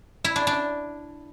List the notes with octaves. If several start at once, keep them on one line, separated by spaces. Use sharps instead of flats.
E4
D4
D4